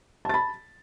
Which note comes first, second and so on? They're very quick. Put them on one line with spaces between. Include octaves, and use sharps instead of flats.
A5 A6 B5